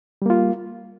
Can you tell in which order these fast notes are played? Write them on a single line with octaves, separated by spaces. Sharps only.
G3 A#3 F4